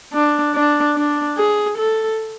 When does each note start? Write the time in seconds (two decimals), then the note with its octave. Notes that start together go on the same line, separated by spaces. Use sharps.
0.14 D4
0.55 D4
0.96 D4
1.38 G#4
1.79 A4